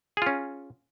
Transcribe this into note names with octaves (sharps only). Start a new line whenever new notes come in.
C#4 F4 G#4